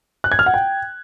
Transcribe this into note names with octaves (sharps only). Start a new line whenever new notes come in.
F#6
G#6
F6
F#5
G5